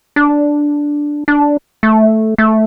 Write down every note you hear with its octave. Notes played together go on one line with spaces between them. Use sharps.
D4
D4
A3
A3